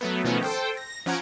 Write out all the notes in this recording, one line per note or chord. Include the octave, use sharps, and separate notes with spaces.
F#3 A3 B3
B2 D#3 F3 A3 B3 C#4
A4 C5 G5
A#6
F3 C#4 F#5 A#5 G#6 D7